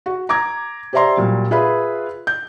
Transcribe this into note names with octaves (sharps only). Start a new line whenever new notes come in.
F#4
A#5 D6 G#6
G4 C5 D5 E5 A#5 C6
A#2 F#3 G3
F4 G#4 B4 E5 F5 B5
G6